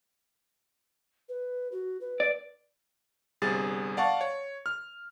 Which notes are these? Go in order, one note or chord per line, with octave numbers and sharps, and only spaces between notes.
B4
F#4
B4
D5
G1 C3 G3 G#4 A6
D5 F5 F#5 A5 C#6
C#5
F6